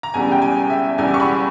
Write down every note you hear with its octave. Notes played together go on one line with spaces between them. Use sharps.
A#5
E1 E2 C#3 G3 G#5
G5
G#5
E5
E1 E2 C#3 G3 G#5
C#6
B5